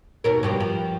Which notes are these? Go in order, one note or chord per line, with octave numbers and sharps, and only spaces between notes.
D#2 B2 A#4
G2 B2 F3
F3